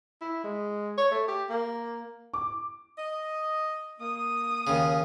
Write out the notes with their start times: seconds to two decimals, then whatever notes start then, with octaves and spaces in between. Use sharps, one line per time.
0.21 E4
0.44 G#3
0.98 C#5
1.11 A3
1.28 G4
1.50 A#3
2.34 D6
2.98 D#5
4.01 A#3 D#6
4.67 D#2 C#3